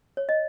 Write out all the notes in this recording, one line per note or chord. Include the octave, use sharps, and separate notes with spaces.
C#5
D#5